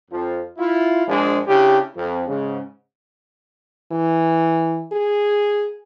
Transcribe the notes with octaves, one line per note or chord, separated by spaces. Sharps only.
F2 F3
E4 F4
A#1 F3 G#3 D4 C5
C#3 D4 E4 G4
F2
G#2 C#3
E3
G#4